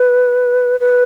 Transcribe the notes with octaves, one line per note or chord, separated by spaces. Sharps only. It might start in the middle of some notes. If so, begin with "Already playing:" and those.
Already playing: B4
B4